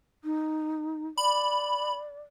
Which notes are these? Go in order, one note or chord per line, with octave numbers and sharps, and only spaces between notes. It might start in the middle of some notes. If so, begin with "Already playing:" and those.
D#4
D5 B5